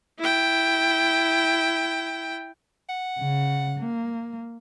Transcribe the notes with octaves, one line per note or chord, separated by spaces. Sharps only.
E4 G5
F#5
C#3
A#3